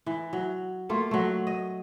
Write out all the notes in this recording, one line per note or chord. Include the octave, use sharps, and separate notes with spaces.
E3
F#3
A3 A#3 F4
F#3 A3
D#5